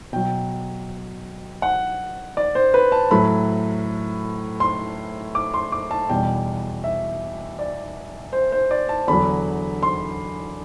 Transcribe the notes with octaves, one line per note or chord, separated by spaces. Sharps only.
B2 F#3 G5
F#5
D5
C5
B4
A5
A2 F#3 B5
C6
D6
C6
D6
A5
E2 B2 G3 G5
E5
D5
C5
C5
D5
A5
E2 D3 F#3 B5
C6